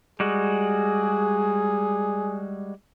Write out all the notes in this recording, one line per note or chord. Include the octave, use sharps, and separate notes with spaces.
G3 G#3 F#4 G#4